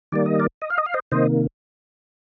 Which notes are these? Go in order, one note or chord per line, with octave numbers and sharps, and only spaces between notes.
D#3 G3 A#3 D5
D#5
A#4 D5
D#5
F5
D#5
F5
C5 D#5
C3 D#3 A#3 C5 D#5